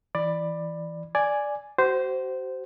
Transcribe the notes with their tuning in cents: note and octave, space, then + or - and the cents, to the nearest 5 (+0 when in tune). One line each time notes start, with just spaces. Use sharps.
E3 +0 D5 +15 B5 +0
D5 +0 G#5 +0
F#4 +40 C5 -10